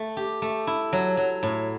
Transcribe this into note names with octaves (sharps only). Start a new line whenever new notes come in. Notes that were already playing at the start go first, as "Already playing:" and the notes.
Already playing: A3
G4
A3
E4
F#3
F#3
A2